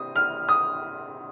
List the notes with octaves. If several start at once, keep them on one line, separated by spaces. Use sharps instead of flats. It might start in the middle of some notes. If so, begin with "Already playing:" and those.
Already playing: C3 C4 D#6
F6
D#6